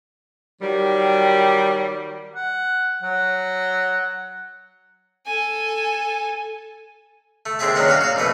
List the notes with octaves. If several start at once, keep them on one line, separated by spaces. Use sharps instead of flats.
D#3 F#3 G3
F#5
F#3 F#5
A4 G#5
A3
D#2 G#3 C4 G#4 E5 A5
G2 F#3 G#3 C#4 F#5
A#2 C#4 F#4 F5
F#4 F5
A#1 B2 A3 B4